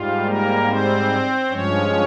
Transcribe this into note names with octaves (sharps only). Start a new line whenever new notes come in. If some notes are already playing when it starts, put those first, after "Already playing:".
Already playing: G#2 G3 F4
A#3 A#4
C4 C5
G2 F3 G#3 C#4 C#5